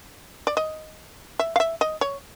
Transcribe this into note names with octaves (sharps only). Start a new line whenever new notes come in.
D5
D#5
E5
F5
E5
D#5
C#5